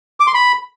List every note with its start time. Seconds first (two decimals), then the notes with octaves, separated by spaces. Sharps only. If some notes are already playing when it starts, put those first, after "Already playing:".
0.20 D6
0.27 C6
0.34 B5